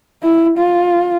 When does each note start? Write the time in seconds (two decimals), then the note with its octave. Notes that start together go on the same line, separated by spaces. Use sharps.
0.23 E4
0.58 F4